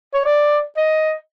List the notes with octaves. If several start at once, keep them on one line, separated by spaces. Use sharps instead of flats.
C#5
D5
D#5